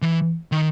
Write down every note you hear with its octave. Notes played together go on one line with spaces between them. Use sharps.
E3
D#3